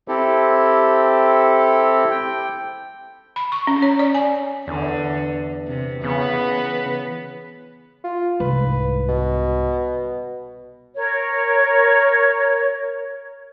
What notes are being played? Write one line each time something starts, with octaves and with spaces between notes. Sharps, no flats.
C4 E4 G4 A4
G5
B5
C#6
C#4
C#5
D5
G#5
E2 D3
C3
C#3 E3 B3 B4
F4
C2 G#2 B4
B2
A#4 C#5